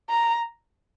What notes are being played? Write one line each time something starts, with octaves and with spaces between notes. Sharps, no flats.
A#5